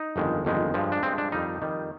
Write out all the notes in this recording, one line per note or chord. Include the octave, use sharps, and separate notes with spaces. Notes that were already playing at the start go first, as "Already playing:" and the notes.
Already playing: D#4
G1 F2 D#3 G#3
G1 F2 D#3 G#3
G2 F3 G#3
D4
G2 F3 G#3 C4
D4
F2 D#3 G3 D#4
F2 D#3 G3